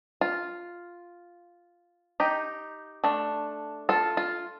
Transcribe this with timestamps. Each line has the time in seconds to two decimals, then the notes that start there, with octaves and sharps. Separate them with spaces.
0.21 F4
2.20 D#4 G4
3.04 A3 D4
3.89 F4 A4
4.17 F4